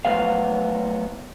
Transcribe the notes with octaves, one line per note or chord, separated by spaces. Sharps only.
A2 F3 F#3 B3 F5